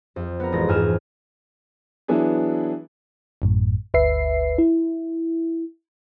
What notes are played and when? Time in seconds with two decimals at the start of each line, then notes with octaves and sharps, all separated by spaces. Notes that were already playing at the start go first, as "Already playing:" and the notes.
0.16 F2
0.40 B3 A#4
0.52 A1 G#3 A#6
0.68 F2 G#2 G#5 F6 E7
2.08 E3 F#3 B3 D4 E4 G#4
3.42 A1 F#2 A2
3.94 G1 D2 B4 E5 C7
4.58 E4